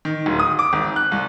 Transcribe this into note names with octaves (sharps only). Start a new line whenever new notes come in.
D#3
D1
D#6
D6
G#1
F#6
C2